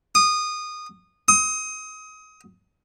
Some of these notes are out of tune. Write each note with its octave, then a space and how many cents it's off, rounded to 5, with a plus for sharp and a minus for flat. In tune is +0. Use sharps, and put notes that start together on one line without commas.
D#6 -20
D#6 +25